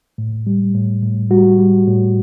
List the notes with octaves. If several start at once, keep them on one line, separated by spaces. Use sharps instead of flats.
A2
G3
A2
A2
G3 F#4
G3
A2